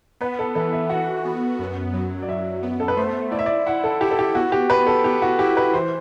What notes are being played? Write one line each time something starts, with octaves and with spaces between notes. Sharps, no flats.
B3 B4
A4
E3 A4
E5
F#4 F#5
B3
F#2
F#3
D5
F#2 E5
B3
A4
B4
A3 C5
E4 D5
E5
D5
E4 F#5
A4
E4 G4
A4
G4
B3 F#4
G4
B3 B4
A4
B3 G4
F#4
E4 G4
B4
E3 C5